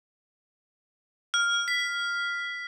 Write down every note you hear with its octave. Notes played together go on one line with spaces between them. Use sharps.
F6
B6